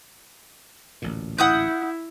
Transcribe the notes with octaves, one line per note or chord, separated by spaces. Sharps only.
A1 D2 A#2
E4 F#5 D#6 G6